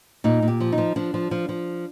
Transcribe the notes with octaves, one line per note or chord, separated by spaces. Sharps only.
A#2 D#4
A#2
G4
F3
D#4
F3
F3 D4
F3
F3
F3